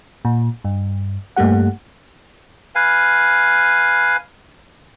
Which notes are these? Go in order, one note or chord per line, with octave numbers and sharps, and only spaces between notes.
A#2
G2
G2 A3 A#3 G4 F#5
B4 F5 G#5